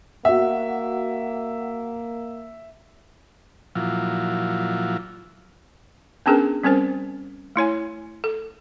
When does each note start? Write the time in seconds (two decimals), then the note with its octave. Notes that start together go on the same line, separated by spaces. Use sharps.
0.25 A#3 F#4 E5 F#5
3.75 A#2 F3 F#3 E4 F4
6.26 B3 C#4 D4 G#4 A#4 B4
6.64 G3 C4 C#4 A#4 C5
7.56 A3 E4 C#5 G#5
8.24 A4